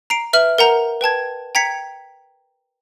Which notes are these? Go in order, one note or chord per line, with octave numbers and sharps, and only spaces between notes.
A#5 C7 D7
B4 E5 F6 F#7
A#4 F#5 A#5 G6
B4 G5 A5 G#6
G5 A#5 G#6 B6 C#7